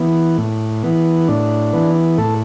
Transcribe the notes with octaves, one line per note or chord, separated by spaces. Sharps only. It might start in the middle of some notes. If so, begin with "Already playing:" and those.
Already playing: E3 B3
A2
E3 B3
A2 D4
E3 B3
A2 A4